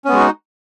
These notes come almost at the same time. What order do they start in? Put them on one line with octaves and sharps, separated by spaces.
C#4 B3 G#3 F#4 D#4